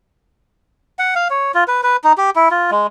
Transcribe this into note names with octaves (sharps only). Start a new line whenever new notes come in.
F#5
F5
C#5
F4
B4
B4
D#4
G4
E4
F4
G#3